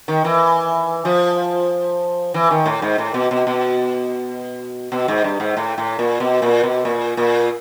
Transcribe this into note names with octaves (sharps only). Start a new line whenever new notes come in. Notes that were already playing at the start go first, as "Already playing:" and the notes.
D#3
E3
F3
E3
D#3
A2
G#2
A2
B2
B2
B2
B2
G#2
G2
G#2
A2
A2
A#2
B2
A#2
B2
A#2
A#2